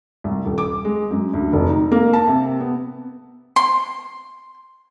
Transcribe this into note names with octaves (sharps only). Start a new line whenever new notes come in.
C2
D#1
D6
G#3
F#2
D2
F1
D#4
A#3
A5
C3
B3
C6